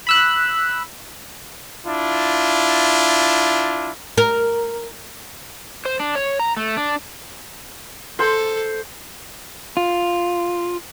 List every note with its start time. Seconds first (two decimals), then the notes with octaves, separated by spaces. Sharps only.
0.07 B5 E6 F#6
1.86 D4 E4 F4
4.18 A#4
5.85 C5
6.00 D4
6.15 C#5
6.40 A#5
6.57 A3
6.77 D4
8.19 A4 C5
9.77 F4